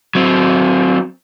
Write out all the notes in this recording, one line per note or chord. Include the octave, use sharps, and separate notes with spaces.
F#3 C4